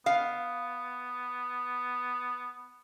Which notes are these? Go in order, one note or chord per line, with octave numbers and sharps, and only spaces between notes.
B3 F5